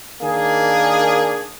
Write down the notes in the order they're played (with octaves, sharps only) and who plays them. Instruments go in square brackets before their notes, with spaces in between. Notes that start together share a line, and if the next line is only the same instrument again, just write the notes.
[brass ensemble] D#3 A#3 D4 G#4